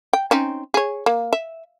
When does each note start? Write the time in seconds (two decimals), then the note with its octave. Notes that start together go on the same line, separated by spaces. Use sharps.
0.13 G5
0.31 C4 C#4 D#4
0.74 G#4 C#5
1.06 A#3
1.33 E5